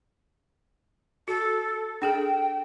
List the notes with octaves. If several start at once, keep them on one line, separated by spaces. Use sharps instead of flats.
F#4 A4
D4 G#4 A4 G5